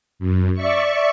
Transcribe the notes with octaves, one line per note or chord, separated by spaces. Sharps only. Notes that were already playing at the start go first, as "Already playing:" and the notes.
F#2
D5 E5 C#6